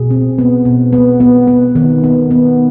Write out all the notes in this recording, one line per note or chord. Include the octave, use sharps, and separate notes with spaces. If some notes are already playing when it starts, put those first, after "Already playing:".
Already playing: B2 G#4
C4
B3
B2
B3
B3
B3
D#3
B3
B3